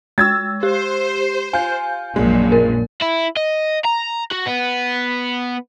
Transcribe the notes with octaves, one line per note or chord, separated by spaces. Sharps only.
G#3 E6 G#6 A6
G4 C5
F4 G#5 G6
A#1 F#2 A#2 G#3
A#4
E4
D#5
A#5
F#4
B3